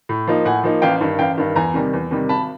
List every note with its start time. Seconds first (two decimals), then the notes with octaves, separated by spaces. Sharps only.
0.09 A2
0.27 F3 A#3 D#4
0.45 A2 F#5 G#5
0.64 F3 A#3 D#4
0.82 A1 F5 G5
1.01 G2 D#3
1.19 A1 F5 G5
1.37 G2 D#3
1.56 E2 G#5 A#5
1.74 C3 D#3 G3
1.93 E2
2.11 C3 D#3 G3
2.29 G#1 A5 B5